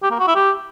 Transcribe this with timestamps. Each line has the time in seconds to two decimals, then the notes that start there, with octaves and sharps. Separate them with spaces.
0.03 G4
0.11 A#3
0.19 F#4
0.27 E4
0.35 G4